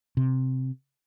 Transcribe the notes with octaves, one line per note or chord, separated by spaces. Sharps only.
C3